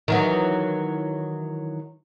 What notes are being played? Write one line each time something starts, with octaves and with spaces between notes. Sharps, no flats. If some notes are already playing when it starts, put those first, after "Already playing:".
D#3 E3 F#3